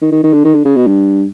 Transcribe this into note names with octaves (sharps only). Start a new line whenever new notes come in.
D#3
D#3
D#3
D3
D#3
D3
C#3
B2
G2